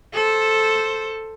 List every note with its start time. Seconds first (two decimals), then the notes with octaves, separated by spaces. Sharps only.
0.13 A4 C5